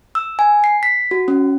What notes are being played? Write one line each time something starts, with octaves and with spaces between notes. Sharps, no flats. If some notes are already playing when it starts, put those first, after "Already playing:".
E6
G#5
C7
B6
F#4
C#4